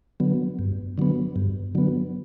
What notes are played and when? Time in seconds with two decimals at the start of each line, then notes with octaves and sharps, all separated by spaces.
0.20 D3 F#3 B3
0.59 G2
0.98 D3 F#3 B3
1.36 G2
1.75 D3 F#3 B3